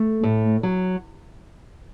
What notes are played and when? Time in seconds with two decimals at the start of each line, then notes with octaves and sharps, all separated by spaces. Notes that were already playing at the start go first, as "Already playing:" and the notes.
Already playing: A3
0.23 A2
0.63 F#3